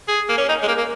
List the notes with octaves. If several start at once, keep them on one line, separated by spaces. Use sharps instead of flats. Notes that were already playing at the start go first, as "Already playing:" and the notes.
G#4
A#3
C#4
D#4
G#3
A#3
A#3